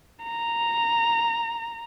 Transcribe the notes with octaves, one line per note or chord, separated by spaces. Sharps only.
A#5